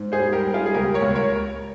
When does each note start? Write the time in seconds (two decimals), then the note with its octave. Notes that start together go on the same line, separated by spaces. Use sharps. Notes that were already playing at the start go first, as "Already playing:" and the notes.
Already playing: G#2
0.12 G#4 C5
0.19 G3
0.33 G4 A#4
0.47 G3
0.54 F4 G#4
0.66 G#4
0.74 C#2 G4 A#4
0.94 A#4 C#5
1.02 C#2
1.15 A#4 C#5